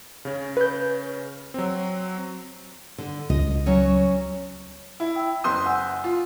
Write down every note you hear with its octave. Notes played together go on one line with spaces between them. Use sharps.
C#3 C#4
B4 G6
F#3 C4
D3
C#2 D#5
F#3 C#4
E4
G5 E6
F#1 C6 D#6 G6
F#5 G#5 E6
F4